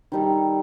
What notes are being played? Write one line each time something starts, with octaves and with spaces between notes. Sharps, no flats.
D#3 G3 D#4 A4